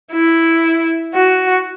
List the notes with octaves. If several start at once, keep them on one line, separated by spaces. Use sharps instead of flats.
E4
F#4